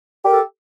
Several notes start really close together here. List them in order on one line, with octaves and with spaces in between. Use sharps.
G4 A#4 A4